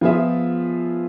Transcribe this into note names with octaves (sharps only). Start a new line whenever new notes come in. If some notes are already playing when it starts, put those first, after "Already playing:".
F3 B3 F4 G#4 E5